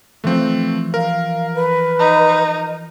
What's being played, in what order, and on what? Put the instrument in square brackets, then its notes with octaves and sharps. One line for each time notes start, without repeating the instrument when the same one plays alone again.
[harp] E3 F3 [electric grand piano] A3 C4
[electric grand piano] A#4 [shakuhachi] F5
[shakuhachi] B4
[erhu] D#4